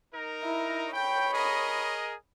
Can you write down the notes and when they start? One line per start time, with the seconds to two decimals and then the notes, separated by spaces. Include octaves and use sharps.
0.12 D#4 A#4
0.43 E4
0.93 C#5 G5 B5
1.32 G#4 A#4 D#5